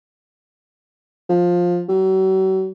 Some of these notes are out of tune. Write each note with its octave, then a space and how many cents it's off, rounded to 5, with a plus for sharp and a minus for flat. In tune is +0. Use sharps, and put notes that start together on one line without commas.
F3 +15
F#3 +40